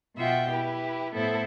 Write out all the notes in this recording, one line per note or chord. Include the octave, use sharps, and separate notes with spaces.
B2 F4 E5 F#5 G5
E4 G4 B4
A2 B3 E4 A4 C5